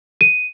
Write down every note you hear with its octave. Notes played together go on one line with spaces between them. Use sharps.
D#7